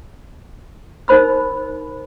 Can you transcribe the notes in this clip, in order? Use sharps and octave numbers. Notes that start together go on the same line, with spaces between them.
D#4 A#4 C5 B5 E6